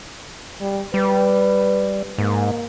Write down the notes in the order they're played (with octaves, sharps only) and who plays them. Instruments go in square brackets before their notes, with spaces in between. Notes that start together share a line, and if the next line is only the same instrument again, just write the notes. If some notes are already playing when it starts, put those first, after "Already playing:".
[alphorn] G3
[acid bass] G3 [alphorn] B4
[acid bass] G#2 [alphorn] A#3